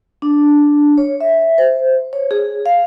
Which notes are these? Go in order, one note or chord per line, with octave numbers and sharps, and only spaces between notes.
D4
C#5
E5
C5
C#5
G#4
F5